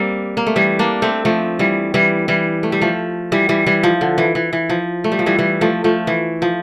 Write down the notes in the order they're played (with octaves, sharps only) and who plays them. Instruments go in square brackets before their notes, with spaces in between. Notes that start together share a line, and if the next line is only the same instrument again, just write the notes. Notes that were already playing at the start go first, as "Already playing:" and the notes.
Already playing: [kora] G3 A#3 C4
A#3
A3
E3 G3
A#3 D4
A3 C4
F3 A3
E3 G3
E3 G3
E3 G3
A3
G3
F3 A3
E3 G3
E3 G3
E3 G3
F3
D3
E3
E3
E3
F3
A3
G3
F3
E3 G3
E3 G3
F3 A3
F3 A3
E3
F3